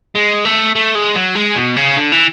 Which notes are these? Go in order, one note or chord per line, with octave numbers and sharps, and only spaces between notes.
G#3
A3
A3
G#3
F#3
G#3
B2
C#3
D3
E3